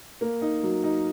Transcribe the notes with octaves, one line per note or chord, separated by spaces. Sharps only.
A#3
D#4
F#3
D#4